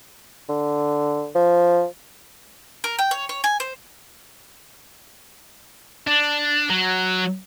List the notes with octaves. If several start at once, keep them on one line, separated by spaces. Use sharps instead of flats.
D3
F3
A#4
G5
C#5
C#5
G#5
C5
D4
F#3